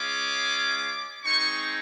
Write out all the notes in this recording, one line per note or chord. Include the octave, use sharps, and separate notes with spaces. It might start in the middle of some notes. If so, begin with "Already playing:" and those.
Already playing: G#3 C#4 F4 D6
G#3 C4 D#4 C#6